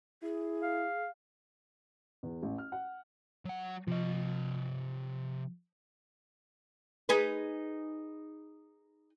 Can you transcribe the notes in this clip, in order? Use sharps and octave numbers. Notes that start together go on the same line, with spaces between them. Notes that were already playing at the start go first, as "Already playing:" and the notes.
E4 G#4
F5
E2
A1
F6
F#5
F#3 F#5
C3 F3 D#5
D#4 G#4 B4